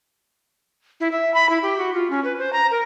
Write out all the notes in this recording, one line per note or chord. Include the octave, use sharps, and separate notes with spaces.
E4
E5
B5
E4
G4
F#4
F4
C#4
B4
C5
A#5
A#4